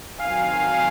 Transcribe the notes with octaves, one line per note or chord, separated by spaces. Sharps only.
D#3 F#3 C4 F5 G#5